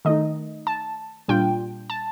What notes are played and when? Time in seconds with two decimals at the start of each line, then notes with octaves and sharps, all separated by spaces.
0.05 D#3 A3 D#4 D#5
0.67 A5
1.28 A#2 G3 D4 F4 G5
1.90 A5